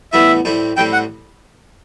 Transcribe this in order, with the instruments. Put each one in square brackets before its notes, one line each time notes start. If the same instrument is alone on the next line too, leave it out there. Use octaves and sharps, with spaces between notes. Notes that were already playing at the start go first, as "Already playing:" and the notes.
[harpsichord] A2 E3 G3 B3 E4 [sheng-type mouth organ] E5
[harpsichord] A2 G3 C4 E4
[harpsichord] A2 G3 C4 E4 [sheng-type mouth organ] G5
[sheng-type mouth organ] F#5